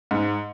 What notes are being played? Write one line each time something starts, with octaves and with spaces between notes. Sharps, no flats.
G#2